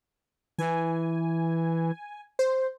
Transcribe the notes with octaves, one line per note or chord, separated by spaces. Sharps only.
E3 G#5
C5